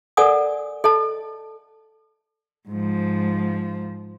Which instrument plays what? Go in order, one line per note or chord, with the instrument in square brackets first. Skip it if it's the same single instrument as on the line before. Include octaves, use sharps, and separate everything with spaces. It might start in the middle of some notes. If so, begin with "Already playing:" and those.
[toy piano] A4 A#4 D5 F#5 G#5 D#6
A4 D#5 A5
[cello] G#2 F3